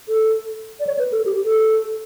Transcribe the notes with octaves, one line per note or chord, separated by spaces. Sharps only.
A4
D5
C#5
B4
A4
G4
A4